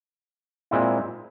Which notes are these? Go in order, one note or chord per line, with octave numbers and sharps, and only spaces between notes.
A#2 G#3 C4 E4